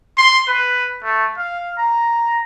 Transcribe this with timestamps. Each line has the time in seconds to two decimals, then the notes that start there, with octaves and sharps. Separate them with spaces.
0.18 C6
0.48 B4
1.04 A3
1.37 F5
1.78 A#5